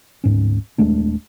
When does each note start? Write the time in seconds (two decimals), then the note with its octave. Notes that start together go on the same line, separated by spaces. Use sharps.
0.24 D1 G#2 C#4
0.78 D#1 G#3 A3 D4